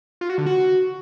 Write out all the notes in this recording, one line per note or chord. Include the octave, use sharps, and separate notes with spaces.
F4
F#4
D3
F#4